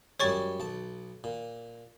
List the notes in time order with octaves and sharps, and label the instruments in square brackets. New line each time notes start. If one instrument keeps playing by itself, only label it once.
[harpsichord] F#2 G3 G#3 [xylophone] C#5 C#6 A6
[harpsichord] B1 A5
A#2